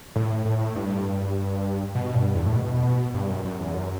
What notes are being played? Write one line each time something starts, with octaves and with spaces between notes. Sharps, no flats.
A2
A2
G2
B2
G2
E2
A2
B2
G2
F#2
F#2
E2
F#2